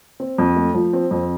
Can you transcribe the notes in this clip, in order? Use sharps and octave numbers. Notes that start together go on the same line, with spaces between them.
C4
F2
A3
F3
C4
F2